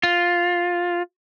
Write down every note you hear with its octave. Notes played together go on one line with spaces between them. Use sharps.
F4